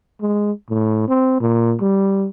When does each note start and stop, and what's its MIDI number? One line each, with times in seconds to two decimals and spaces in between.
0.21 0.52 56
0.70 1.08 45
1.08 1.39 60
1.40 1.75 46
1.81 2.27 55